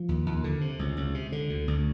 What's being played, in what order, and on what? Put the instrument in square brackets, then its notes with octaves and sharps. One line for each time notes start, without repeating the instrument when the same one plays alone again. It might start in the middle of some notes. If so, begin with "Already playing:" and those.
Already playing: [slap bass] F3
D#2
D#2
D3
C3
C#2
C#2
C3
D3
D2
D2